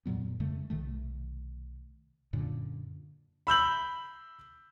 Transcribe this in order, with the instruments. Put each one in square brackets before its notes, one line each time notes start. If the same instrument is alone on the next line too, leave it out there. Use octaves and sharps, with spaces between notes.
[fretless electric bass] F2 A#2 F#3 B3
F2 C#3 G#3 A3
B1 C3 D#3 A3
F#2 A#2 D3
[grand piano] B5 E6 G6 F#7